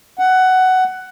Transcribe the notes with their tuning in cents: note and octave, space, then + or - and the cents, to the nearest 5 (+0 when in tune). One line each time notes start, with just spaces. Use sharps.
F#5 +10